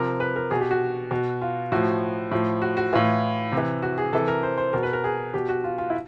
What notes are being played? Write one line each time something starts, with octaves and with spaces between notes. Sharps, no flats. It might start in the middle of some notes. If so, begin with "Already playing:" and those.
Already playing: C3 F3 A#4
B4
A#4
B2 G#4
G4
F#4
B2
F4
A2 F3 F#4
A2 F3
F#4
F#4
A2 E3 F4
C3
E3
F#4
G#4
C3 E3 A4
A#4
C5
C5
B2 A#4
B4
A#4
G#4
B2 G4
F#4
F4
F4
E4